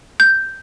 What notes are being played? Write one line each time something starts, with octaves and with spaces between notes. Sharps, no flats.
G6